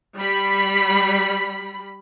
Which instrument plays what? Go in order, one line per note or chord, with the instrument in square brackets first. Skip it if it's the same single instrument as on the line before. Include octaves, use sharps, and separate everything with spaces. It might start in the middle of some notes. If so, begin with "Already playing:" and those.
[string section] G3 B5